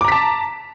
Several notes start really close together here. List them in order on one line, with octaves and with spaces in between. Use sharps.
D6 A#5 B6 A5